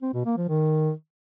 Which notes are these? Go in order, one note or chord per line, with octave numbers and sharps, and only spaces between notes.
C4
B2
A#3
F3
D#3